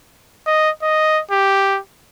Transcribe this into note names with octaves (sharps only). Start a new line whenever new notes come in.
D#5
D#5
G4